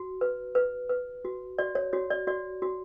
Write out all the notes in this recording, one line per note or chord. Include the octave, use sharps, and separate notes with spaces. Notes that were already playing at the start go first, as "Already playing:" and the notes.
Already playing: F#4
B4
B4
B4
F#4
F#4 D5
C#5
F#4 C#5
D5
F#4 D5
F#4